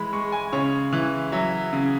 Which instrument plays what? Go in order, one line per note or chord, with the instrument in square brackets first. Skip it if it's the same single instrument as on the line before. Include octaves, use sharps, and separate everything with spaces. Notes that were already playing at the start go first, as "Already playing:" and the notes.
Already playing: [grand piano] E3 G#3 B5
G#3 C#6
G#5
C#3 C#5
E3
F#3 E5
C#3